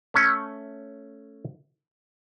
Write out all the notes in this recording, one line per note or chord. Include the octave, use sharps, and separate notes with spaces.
A3 C#4